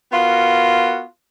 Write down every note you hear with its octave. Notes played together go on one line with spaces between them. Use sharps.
B3 F4 F#4 A#4